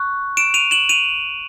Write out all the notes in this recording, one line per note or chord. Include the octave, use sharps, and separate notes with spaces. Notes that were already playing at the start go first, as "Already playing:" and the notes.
Already playing: C#6 F#6
D7 E7
D#7 F7
E7 F#7
D#7 F7